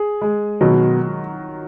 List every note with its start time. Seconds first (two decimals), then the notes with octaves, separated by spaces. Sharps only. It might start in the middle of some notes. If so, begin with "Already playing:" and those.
Already playing: G#4
0.21 G#3
0.61 B2 D#3 F#3